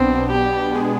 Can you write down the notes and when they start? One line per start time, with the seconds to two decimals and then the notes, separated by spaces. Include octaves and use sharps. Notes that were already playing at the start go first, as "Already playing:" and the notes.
Already playing: B1 B2 B3 C4 D4
0.30 G4
0.72 B2 G#3 B3 D4 G#4